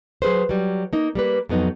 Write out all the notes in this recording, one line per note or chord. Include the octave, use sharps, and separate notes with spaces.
F#3 G#4 B4 C5
F#3 G3
A#3 D#4
G3 A#3 B4
F2 F#3 B3 D#4